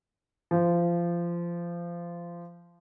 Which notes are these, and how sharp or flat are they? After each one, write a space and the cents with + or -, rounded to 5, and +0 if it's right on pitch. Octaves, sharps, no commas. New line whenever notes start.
F3 -20